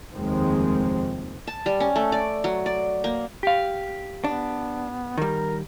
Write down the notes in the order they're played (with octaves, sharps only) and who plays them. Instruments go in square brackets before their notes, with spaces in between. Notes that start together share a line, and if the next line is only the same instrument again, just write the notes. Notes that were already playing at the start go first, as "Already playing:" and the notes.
[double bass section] F1 D#2 D#3 F3 G#3 C4
[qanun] A5
G3
C#4
A3
D5
F#3
D5
A#3
[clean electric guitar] G4 F5
[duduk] B3 [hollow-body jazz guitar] D4
[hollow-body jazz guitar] D#3 G3 [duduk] A#4